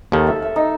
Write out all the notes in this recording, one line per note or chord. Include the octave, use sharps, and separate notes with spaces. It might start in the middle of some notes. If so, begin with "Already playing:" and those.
D#2 D#3 A4
E5
E5
D#4